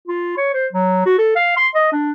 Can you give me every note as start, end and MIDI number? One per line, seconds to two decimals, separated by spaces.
0.08 0.34 65
0.37 0.50 73
0.54 0.67 72
0.73 1.05 54
1.06 1.18 66
1.18 1.33 69
1.36 1.55 77
1.57 1.68 84
1.75 1.90 75
1.92 2.12 62